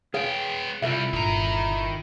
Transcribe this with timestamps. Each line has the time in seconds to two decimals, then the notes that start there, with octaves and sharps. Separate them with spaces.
0.14 B3 G#4 C#5 F5 G5
0.82 C2 G3 E4 F4 A4 E5
1.13 G1 A#2 D#3 A#5